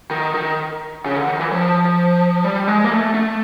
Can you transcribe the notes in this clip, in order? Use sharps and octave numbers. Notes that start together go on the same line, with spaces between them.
D#3
D#3
C#3
D3
D#3
E3
F3
G3
G#3
A#3
A3
A3